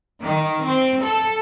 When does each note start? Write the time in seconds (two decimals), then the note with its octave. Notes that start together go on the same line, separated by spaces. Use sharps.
0.22 D#3
0.63 C4
1.02 A4